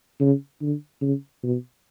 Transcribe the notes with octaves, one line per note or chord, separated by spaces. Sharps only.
C#3
D3
C#3
B2